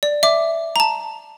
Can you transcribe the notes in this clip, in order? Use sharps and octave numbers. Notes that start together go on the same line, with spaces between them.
D5
E5 D6
A5 A#5